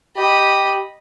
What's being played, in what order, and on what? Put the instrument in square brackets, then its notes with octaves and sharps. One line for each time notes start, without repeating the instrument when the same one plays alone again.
[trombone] G4 [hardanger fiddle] D#5 B5